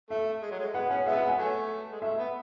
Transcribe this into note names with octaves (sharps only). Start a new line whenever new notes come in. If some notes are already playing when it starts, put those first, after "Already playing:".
A3 E5
G#3
F#3
G#3
B3 F#5
C#4 F#5
G#3 B3 E5
F#5
G#5
F#3 A3
G#3
A3 E5
B3